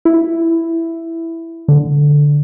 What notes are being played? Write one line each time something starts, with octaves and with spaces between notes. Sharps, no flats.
E4
D3